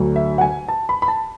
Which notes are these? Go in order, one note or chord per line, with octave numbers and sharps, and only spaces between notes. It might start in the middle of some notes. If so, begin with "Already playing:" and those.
Already playing: D2 D3 F#3
E5
F#5
G#5
A5
B5
B5
A5